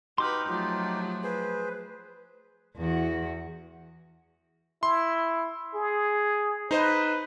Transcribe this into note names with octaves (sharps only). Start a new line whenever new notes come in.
D#4 F#4 G4 B4 C6 D6 F6
F3 F#3 A3 F4
G#4 B4 C5
E2 F#4
E4 C6
G#4
D#4 B4 C5 D#5